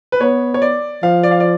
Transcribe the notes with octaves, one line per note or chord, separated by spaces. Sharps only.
B4
B3 C#5
C#5
D5
F3 F5
D5
F5
D5